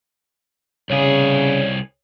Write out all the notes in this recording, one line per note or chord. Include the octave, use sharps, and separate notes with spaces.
C2 C#3 G#4 C#5